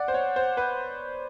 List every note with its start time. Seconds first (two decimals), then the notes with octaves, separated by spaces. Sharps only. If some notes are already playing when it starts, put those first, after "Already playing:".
Already playing: D5 F#5
0.08 C5
0.14 C#5
0.36 C5
0.57 B4